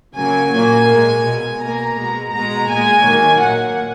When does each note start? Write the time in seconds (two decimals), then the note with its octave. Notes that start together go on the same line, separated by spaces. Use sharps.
0.15 C#3 F#3 A#3 G#5
0.52 A#2 F#3 A#3
0.87 A#2 G#3
1.24 B2 G#3
1.60 B2 A#3 A#5
1.97 B2 G#3
2.33 B2 G#3 A#5
2.69 A#2 G#3 G#5
3.06 D#3 F#3 A#3
3.42 A#2 A#3 F#5